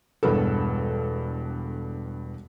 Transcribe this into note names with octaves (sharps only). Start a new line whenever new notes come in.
E1 G2 B3 A4